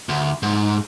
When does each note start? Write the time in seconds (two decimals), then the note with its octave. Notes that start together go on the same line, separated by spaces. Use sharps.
0.09 D2
0.43 G#2